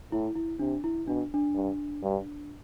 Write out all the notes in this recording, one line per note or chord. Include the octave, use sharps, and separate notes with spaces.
A2 E4
E4
C3 D4
E4
B2 D4
D4
G2
G2